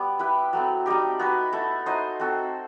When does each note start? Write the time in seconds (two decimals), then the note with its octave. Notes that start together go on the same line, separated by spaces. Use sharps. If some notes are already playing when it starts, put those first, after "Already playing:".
Already playing: G3 B3
0.19 E4 G4 B4
0.53 F#3 A3 C4
0.86 G3 C4 D#4 G4
1.19 B3 F#4 B4
1.53 A3 E4 A4
1.86 D#4 F#4 C5 D#5
2.20 C4 F#4 A4